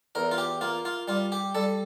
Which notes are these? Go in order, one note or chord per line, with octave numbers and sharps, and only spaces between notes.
E2 A#4
F4
G4
A#3 F4
F4
G3 F4
G4
G3 A4